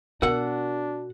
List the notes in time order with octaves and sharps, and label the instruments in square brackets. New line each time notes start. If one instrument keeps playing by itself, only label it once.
[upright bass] B2 [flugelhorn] D4 [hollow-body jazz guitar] F#4 F#5 [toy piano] A#4